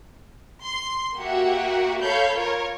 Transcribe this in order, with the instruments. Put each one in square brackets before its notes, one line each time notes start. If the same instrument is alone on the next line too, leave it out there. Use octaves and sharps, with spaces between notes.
[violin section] C6
A#3 F#4 G4 E5 F#5
A4 C#5 F5 B5 G6
F4 A#4 C#5